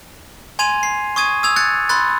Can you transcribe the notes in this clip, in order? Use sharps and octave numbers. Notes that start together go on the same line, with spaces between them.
G#5 C6 G#6 D#7 F7
C7
C#6 D#6 G#6 D#7
D#6 E6 G#6 F7
F#6 G#6 A6 C#7
B5 C6 F#6 A6